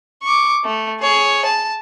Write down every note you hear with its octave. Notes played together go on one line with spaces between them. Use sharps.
C#6 D6
A3
G#4 C#5
A5